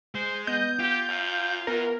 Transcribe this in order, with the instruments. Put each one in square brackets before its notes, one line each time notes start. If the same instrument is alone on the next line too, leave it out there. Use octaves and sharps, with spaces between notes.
[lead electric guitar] G#3 [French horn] C5
[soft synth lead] B3 [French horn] D#5 [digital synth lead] G6
[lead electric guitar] F4 [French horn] G4
[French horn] F#2 [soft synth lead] F5
[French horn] E3 [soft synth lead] B3 [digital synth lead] A#4